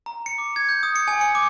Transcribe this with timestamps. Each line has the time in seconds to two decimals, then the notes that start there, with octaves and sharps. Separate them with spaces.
0.06 A#5
0.26 C#7
0.38 D6
0.56 G#6
0.69 G6
0.83 D#6
0.96 C#7
1.08 G#5
1.21 C#7
1.35 D6